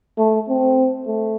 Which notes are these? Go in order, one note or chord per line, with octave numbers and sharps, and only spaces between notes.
A3
C4
A3